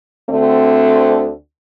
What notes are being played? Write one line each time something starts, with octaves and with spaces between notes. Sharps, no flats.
D2 D3 A3 C4